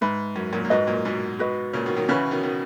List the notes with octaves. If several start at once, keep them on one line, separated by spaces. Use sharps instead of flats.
G#2 B4 E5 B5
F#2
F#2 A#2
A#2
G#2 F#4 B4 D#5
F#2 A#2
G#2 B2
F#4 B4 D#5
A#2 C#3
B2 D#3
D#3 F#3
C#3 E3 C#4 F#4 B4
B2 D#3
B2 D#3